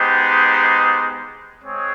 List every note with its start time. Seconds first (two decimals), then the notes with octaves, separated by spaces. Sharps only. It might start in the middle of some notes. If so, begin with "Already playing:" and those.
Already playing: G#3 B3 D#4 G4 C5
1.63 G#3 C4 G#4 C#5